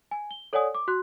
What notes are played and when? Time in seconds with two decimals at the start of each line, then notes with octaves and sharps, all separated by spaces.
0.11 G#5
0.31 G7
0.53 A4 C#5 D5 F#5 G#5 D#6
0.75 D6
0.88 F#4 C6 F#6